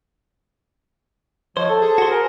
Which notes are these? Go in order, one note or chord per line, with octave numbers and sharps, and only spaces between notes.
F3 C5 C#5 D#5
A4 A5
G#4
F#4 C5
A#4 G#5